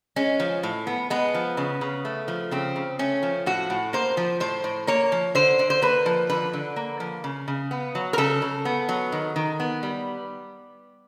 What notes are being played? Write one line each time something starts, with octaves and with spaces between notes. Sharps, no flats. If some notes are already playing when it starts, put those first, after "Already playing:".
G#3 C#4
F3
A2
B3
G#3 B3
F3
C#3
C#3
A3
F3
C#3 C4
C#3
A3 C#4
F3
A2 F#4
A2
A#3 C5
F3
A2 C5
A2
A#3 C#5
F3
D3 C5
D3
C5
A#3 B4
F3
D3 B4
D3
A#3
F3
C#3
C#3
B3
F#3
A#4
C#3 A4
C#3
B3
F#3
D#3
D#3
B3
G3